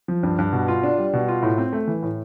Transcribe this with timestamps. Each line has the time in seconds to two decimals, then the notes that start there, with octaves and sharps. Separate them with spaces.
0.08 F3
0.23 G2
0.39 G2
0.52 B2
0.68 F4
0.84 D4
0.98 G3
1.13 B2
1.28 F4
1.42 A2
1.58 C4
1.73 A3
1.88 E3
2.03 A2